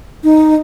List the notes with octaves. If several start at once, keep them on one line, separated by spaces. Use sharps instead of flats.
D#4